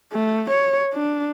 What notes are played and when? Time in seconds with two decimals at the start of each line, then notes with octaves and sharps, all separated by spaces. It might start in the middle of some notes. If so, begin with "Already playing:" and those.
0.12 A3
0.51 C#5
0.94 D4